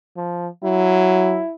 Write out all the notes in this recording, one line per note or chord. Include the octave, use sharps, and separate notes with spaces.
F3
F#3 E4